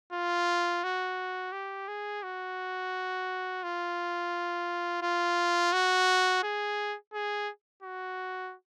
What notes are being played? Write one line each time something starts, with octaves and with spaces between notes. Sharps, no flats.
F4
F#4
G4
G#4
F#4
F4
F4
F#4
G#4
G#4
F#4